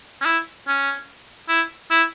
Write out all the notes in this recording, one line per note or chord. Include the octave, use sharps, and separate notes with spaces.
C#4
E4
C#4
E4
E4